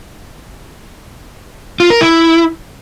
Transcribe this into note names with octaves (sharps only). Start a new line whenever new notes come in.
F4
A#4
E4